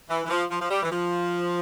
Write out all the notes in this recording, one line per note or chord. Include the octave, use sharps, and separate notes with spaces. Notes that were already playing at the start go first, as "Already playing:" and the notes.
E3
E3
F3
F3
F3
G3
E3
F3